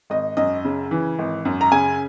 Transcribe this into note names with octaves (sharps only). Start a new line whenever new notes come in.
G#1 D#5
F#2 D#5
C#3
E3
G#1
F#2
A#5
C#3 G#5